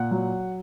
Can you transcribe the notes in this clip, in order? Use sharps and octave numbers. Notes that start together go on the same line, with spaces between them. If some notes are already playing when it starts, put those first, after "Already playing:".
Already playing: A#2 F#5
F#3